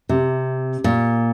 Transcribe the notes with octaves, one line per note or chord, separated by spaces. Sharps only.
C3
A#2